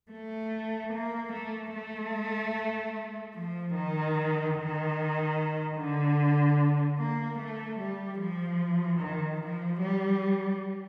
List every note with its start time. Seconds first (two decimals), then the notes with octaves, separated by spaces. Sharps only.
0.12 A3
0.94 A#3
1.33 A3
1.73 A3
3.36 F3
3.76 D#3
4.56 D#3
5.77 D3
6.99 A#3
7.39 A3
7.79 G3
8.20 F3
9.00 D#3
9.41 F3
9.81 G3